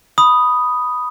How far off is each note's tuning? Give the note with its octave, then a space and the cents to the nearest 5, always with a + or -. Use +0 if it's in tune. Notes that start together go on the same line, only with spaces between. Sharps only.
B5 +0 D#6 +0